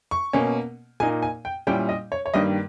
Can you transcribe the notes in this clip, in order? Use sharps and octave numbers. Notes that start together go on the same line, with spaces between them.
C#6
B2 A#3 C#4
A#2 A#3 D#4 G#5
G#5
G5
A#2 G3 C#4 E4 G5
D#5
C#5
C#5
G2 D#3 G3 A#3 D#5